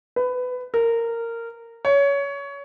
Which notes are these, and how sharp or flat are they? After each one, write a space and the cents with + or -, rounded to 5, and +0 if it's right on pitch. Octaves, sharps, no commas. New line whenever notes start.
B4 +20
A#4 -15
C#5 +20